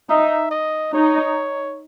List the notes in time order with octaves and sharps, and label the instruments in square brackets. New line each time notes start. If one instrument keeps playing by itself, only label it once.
[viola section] D#4 [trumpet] E5
[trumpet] D#5
[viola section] D#4 [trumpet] C#5